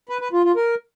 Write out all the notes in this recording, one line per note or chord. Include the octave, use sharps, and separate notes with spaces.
B4
B4
F4
F4
A#4